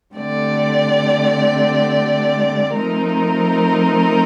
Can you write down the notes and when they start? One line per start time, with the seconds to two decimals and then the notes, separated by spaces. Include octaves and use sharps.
0.14 D3 A3 C4 G4 D5
2.72 F3 A3 C4 D#4 A#4